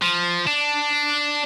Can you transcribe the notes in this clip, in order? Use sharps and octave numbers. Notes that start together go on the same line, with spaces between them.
F3
D4